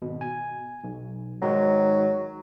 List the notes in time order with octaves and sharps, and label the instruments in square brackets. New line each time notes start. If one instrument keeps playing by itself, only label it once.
[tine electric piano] G#1 B2
G#5
B1
[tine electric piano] G#2 D#3 G#3 [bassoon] F#3